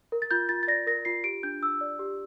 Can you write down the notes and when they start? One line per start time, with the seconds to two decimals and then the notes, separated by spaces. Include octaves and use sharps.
0.12 A#4
0.22 A6
0.31 F4 G6
0.49 F4 A6
0.63 A6
0.68 D5 A#6
0.87 A#4 A#6
1.05 F4 C7
1.24 G4 D7
1.43 D4 G6
1.62 D4 E6
1.81 D5
1.99 G4